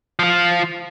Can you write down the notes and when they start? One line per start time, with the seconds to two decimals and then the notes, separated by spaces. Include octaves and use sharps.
0.19 F3 F4